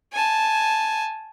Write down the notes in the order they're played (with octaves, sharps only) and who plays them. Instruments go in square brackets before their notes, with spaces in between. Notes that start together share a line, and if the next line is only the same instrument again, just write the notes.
[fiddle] G#5 A5